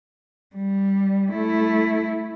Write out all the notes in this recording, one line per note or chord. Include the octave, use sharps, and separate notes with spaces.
G3
A3 E4